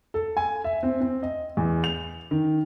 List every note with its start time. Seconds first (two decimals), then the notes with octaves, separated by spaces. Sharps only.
0.14 A4
0.37 G#5
0.64 E5
0.83 C4
1.00 C4
1.23 D#5
1.57 E2
1.84 F7
2.31 D#3